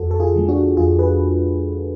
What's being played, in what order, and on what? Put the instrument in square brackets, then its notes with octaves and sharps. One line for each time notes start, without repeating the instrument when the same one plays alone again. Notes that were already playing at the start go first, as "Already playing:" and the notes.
Already playing: [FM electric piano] F2 F#4 A4
A4
F4 G#4
D3 F3 G#3
D4 F#4
F2 F4 G#4
G#4 B4